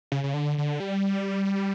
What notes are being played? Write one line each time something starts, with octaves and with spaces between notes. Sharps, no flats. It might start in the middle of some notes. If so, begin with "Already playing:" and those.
C#3
C#3
D3
D3
G3